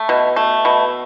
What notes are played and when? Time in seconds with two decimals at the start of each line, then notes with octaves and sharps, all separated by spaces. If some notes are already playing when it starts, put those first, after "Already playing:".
Already playing: A3
0.09 B2
0.36 A3
0.65 B2